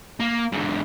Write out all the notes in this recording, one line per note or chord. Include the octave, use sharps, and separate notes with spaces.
A#3
G#2 D3